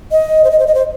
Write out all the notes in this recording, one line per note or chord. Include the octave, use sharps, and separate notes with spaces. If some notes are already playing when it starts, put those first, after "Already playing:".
D#5
C5
D#5
C5
D#5
C5